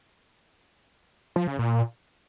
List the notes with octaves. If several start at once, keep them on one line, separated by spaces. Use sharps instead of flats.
F3
C#3
A#2